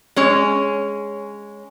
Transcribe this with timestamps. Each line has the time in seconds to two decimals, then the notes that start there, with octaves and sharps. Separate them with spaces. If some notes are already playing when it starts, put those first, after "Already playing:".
0.16 G#3 C#4 C#5